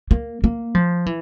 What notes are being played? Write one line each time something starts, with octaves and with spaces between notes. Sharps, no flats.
A#3
A#3
F3
E3